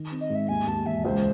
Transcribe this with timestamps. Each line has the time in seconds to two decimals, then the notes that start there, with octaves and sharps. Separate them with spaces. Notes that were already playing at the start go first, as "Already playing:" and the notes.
Already playing: D#3
0.12 C4
0.21 D#5
0.30 G#2
0.35 E5
0.49 D#2 G#5
0.67 D#2 A5
0.85 E1 E5
1.04 C#2 C5